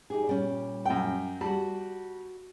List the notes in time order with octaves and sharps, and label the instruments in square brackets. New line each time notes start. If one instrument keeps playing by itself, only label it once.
[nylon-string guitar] D#4 G4 G#4
A#2 G3 C#4
[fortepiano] F#2 G5
[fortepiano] G3 [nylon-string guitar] F#4 A5